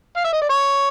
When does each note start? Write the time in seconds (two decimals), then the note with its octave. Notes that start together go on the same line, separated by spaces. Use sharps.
0.16 F5
0.24 E5
0.33 D#5
0.42 D5
0.49 C#5